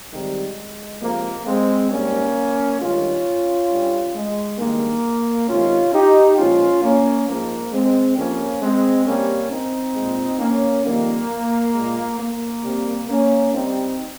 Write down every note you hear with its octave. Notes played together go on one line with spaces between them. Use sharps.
C3 D#3 G3 G#3
C3 F3 G#3 A#3
G#3 C4
G#2 G3 A#3 C#4
G2 D#3 G#3 C#4 F4
G2 G3
G#3
G2 D#3 G#3 A#3
C3 D#3 G#3 C#4 F4
D#4 G4
A#2 F3 G#3 C#4 F4
A#3 C#4
G#2 F3 G#3 A#3
G#3 C4
F2 C3 F3 A#3 C#4
G#3 C4
C3 G3 A#3 C#4
C4 D#4
A#2 G#3
A#3 C#4
F2 D#3 G3 A#3
A#2 G#3
A#3
C3 G3
A#3 C#4
C3 G3 C4 D#4